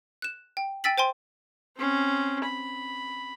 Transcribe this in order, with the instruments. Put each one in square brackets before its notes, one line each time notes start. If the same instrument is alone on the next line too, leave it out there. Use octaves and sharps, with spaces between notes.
[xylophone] F#6 E7
G5
G5 G#5 E6 A6 B6 F#7
C5 G5 G#5 C6
[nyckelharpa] C4 C#4
B5